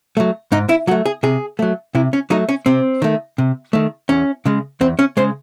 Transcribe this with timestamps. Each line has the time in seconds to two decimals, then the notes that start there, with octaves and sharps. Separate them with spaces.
0.17 F#3 A3
0.52 G#2 D#4
0.69 E4
0.87 F#3 F#4
0.91 A3
1.06 G#4
1.23 C3 G#4
1.59 F#3 A3
1.95 C3 E4
2.13 C#4
2.30 F#3 A3 D#4
2.49 C#4
2.66 C3 C4
3.02 D#3 A3
3.38 C3
3.73 D#3 A3
4.09 E2 C#4
4.46 C#3 G#3
4.81 E2 C4
4.99 C#4
5.17 C#3 G#3 C5